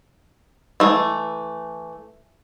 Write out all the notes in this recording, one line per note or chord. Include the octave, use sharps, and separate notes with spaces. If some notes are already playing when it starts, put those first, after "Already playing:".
E3 A3